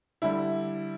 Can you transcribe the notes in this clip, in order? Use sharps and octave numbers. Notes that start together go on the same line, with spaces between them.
D3 G3 E4